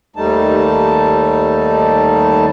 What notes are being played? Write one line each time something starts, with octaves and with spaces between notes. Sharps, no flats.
D#2 G3 A3 D#4 A5